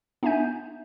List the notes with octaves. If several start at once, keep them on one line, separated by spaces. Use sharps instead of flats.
B3 D4 D#4 E5 G#5 G6